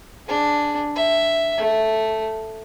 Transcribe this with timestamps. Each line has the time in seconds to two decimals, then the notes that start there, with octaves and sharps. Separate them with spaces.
0.27 D4 G#4
0.95 E5
1.58 A3